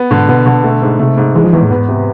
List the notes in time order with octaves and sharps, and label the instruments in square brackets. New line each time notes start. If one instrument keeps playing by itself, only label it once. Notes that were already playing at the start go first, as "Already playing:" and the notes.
Already playing: [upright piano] B3
[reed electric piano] G#2 [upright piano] D3
[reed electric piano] B2 [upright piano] B3
[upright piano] D3
A3
G#2
[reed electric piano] C3 [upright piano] A3
[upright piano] G#2
[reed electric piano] E3 [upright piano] G#3
[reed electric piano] F3
[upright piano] E2 [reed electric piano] E3
[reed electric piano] A2
[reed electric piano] G#2 [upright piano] B3
[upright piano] C3